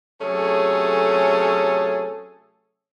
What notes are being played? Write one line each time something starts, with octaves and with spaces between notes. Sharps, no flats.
C3 F#3 A3 C#4 G#4 A4